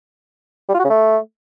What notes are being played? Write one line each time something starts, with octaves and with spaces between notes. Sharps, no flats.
G3
F4
F#4
C#3
A3